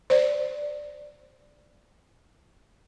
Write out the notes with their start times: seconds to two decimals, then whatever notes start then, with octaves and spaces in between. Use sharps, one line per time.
0.10 C5 D5